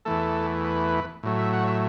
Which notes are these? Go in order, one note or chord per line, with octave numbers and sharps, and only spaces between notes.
E2 E3 A3 A4
B4
A2 F#3 A3
E5
F#5
C#5
E5